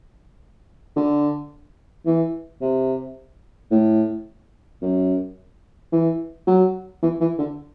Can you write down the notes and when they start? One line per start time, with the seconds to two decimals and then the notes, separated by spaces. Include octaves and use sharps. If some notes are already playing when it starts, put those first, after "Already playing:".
0.96 D3
2.06 E3
2.61 C3
3.71 A2
4.82 F#2
5.92 E3
6.47 F#3
7.03 E3
7.21 E3
7.39 D3